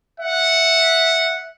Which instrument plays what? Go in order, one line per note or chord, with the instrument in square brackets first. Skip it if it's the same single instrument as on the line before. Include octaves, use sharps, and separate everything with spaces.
[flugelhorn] E5 [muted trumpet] F#5